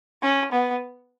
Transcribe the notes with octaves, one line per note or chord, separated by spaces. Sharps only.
C#4
B3